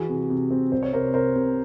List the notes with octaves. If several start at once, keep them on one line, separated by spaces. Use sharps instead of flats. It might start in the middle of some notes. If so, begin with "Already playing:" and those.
Already playing: E3 F#4 G#4
C3
C3
C4
C2 C5
C#5
C3 A#4 C5
C3 A#4 C5
C3